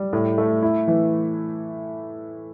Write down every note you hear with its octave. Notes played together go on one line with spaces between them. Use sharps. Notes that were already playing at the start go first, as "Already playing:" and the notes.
Already playing: G3
A2
A3
E4
E3